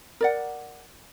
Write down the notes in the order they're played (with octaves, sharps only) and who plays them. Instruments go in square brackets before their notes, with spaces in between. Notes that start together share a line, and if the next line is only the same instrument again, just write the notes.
[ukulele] A#4 D5 F#5